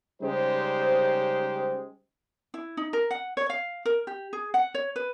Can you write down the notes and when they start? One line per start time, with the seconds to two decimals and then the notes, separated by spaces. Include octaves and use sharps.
0.22 C#3 G3 G#3 D#4 G4 C5
2.54 E4
2.77 D#4
2.93 A#4
3.11 F#5
3.37 C#5
3.50 F5
3.85 A#4
4.07 G4
4.33 G#4
4.54 F#5
4.75 C#5
4.96 B4